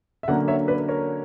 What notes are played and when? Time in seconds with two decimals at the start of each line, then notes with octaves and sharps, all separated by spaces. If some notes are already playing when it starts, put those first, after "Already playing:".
0.23 E5
0.28 D3 F#3 A#3 C#4 D5 F#5
0.48 C#5 E5
0.68 B4 D5
0.88 A#4 C#5